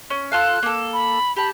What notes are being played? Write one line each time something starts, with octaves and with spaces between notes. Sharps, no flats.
C#4
F4 A4 F5 F#6
A#3 A4
B5
G4 A5 B5